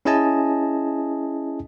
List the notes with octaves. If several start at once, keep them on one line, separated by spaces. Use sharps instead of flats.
C#4 E4 G#4 D#5 G#5 A5